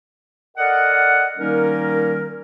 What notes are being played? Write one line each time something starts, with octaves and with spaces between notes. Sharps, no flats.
A4 A#4 D5 D#5 F#5
D#3 G3 A#3 C#4 D#4 A#4